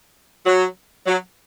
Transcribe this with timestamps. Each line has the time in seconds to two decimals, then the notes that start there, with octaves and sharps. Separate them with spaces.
0.46 F#3
1.07 F#3